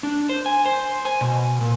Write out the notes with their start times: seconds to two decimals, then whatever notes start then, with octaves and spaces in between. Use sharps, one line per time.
0.03 D4
0.29 C5
0.46 G#5
0.66 C5
1.05 G#5
1.21 B2
1.61 A#2